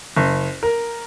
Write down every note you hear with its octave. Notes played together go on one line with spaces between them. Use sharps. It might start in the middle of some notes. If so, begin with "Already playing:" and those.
F#1
A#4